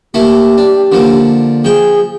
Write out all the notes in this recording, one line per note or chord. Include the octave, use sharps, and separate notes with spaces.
A3 A#3 E4 G4
D4
D3 F3 A#3
F3 G#4 G5